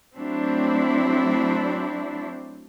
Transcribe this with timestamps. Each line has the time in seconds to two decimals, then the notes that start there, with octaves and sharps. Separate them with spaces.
0.16 F#3 A3 C4 D4 E4